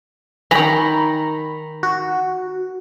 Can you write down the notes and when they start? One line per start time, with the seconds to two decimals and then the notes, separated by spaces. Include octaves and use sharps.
0.51 D#3 E3 A#5 B5
1.83 F#4